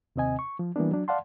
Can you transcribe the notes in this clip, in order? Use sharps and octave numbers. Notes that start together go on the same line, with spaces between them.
D#2 C3 C4 D#5 G#5
C#6
F3
E3 G3 A#3 B3 D4
F#3 D4
D5 F5 F#5 A5 C6